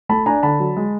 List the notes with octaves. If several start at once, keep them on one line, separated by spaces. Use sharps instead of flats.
A3 A5 B5
D4 G#5 A#5
D3 A5 B5
F#3
G#3